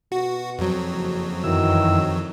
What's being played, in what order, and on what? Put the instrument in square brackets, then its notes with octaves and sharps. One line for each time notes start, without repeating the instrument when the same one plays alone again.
[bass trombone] B2 [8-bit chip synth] F#4
[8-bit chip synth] F2 F#3
[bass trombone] F#1
[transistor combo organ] F#2 E3 E6 [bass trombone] D#3